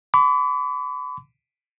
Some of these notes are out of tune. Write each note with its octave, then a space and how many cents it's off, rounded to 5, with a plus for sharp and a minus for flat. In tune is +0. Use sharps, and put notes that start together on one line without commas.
B5 +35 D6 -40